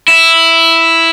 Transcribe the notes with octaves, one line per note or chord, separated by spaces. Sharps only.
E4